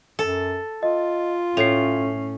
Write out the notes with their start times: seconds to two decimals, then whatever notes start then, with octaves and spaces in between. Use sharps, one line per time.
0.19 F#2 A4
0.83 F4 D#5
1.57 A2 C#4 C7 F7